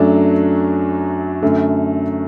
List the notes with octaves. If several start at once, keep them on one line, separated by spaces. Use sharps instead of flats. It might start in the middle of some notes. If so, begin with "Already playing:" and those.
Already playing: F#2 F#3 A3 D4
F#2 D3 A3